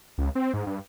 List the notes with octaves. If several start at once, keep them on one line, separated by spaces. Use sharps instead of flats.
C#2
C4
G#2
G2